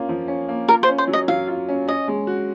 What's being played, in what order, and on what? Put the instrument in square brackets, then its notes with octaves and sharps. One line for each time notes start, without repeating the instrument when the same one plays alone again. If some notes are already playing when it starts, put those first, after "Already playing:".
Already playing: [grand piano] A#3 C#4 F4
F3
C#4
A#3
[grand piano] F4 [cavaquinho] A#4
[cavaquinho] C5
[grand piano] C#4
[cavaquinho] C5
[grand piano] F#3
[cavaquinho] D#5
[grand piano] F#3 [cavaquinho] F5
[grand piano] F4
C#4
[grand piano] C#4 [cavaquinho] D#5
[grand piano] G#3
F#4